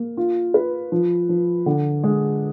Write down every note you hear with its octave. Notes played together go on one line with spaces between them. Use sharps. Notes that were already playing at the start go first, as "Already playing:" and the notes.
Already playing: A#3
F4
B4
F3
F3
D3
G#3